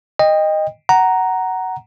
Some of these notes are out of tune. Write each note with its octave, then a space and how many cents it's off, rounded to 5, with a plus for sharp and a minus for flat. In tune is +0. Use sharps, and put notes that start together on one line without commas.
D#5 -5 G5 +25
F#5 +15 A#5 +0